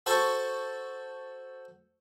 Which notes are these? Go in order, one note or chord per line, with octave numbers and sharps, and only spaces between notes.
F#4 A4 C5 A5 C#6